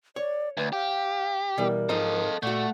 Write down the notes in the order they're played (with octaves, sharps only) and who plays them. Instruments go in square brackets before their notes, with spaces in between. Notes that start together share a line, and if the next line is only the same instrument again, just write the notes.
[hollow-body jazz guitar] C#5 [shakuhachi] D5
[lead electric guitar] D2 [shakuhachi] B4
[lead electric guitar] G4 [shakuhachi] F5
[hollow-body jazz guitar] B2 E3 G3 [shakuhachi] A#4
[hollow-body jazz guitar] G#2 F3 D#4 [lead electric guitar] A4 D#5
[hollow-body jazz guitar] A#2 F#4 [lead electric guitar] A3 [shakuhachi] F#5